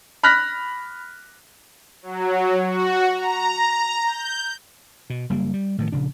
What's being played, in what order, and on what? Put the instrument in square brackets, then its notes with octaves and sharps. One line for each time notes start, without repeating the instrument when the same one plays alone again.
[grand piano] B5 F6 F#6 A#6 B6
[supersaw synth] F#3
F#4
A#5
G6
[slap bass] B2
F#1 G3 A#3
G3
A2 D#3 F3
A#1 C#3 D4